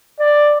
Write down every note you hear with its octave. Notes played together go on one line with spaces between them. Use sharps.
D5